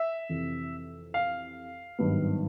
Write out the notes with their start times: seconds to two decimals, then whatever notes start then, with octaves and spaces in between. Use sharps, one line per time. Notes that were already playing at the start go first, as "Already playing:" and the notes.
Already playing: E5
0.29 F2 C3 E3
1.14 F5
1.99 G#1 G2 D#3 F#3 B3